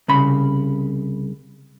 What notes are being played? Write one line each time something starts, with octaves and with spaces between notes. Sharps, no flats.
C2 C#3 B5